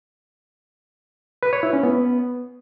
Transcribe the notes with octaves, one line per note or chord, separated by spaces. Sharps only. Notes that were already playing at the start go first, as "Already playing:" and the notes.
B4
C#5
E4
C#4
B3